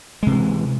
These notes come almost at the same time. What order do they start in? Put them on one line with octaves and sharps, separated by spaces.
G#3 C3 E3